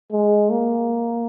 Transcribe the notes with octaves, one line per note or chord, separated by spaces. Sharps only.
G#3
A#3